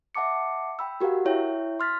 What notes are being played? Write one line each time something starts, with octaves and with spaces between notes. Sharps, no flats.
E5 F#5 A5 D6 C#7
G5 B5 E6
F#4 G4 A#4 F5 F#5
E4 C#5 E5 G5
C6 F6 A6 B6